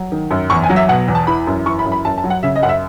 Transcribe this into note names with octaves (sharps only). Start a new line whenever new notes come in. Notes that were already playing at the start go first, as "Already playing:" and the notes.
Already playing: F#3
D#3
F#2
E2 C#6
G#5
F#3
E5
B2 F#5
E2
A5
E3 B5
F#2
E3 C#6
B5
F#2
B5
F#2 A5
A5
F#3
F#5
C#3 E5
D#5
F#2 F#5
E5